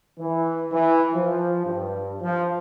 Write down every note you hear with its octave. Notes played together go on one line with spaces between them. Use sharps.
E3
E3
F3
G2
F3